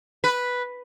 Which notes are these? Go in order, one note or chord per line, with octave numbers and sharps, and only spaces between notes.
B4